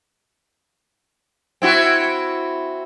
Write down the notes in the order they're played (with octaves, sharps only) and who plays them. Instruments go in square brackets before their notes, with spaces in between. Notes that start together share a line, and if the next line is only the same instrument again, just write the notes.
[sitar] C4 E4 F#4